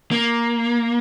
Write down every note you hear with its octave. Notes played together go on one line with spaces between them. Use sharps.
A#3